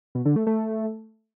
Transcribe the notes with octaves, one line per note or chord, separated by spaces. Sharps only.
B2
D3
A3
A3